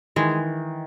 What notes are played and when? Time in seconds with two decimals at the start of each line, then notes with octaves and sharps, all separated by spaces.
0.16 D#3 E3 G#3